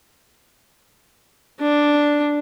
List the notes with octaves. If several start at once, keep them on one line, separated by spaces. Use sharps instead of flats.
D4